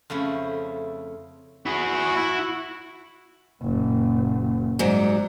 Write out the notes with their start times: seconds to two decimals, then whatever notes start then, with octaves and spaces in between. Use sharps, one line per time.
0.10 F2 C#3 A3 E4
1.66 E4 F#4 G#4
2.17 E4
3.61 F#1 A#2
4.79 G#2 F#3 G3